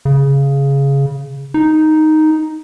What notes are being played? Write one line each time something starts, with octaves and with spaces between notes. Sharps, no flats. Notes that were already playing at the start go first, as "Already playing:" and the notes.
C#3
D#4